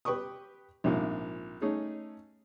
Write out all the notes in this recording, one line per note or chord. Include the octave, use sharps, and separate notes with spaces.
G4 B4 G5 C#6 D#6
A#1 G#2 C3 F3 A#3
A3 C#4 D#4 G#4